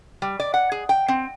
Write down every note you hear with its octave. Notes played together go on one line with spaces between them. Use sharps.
G3
D5
F#5
G#4
G5
C4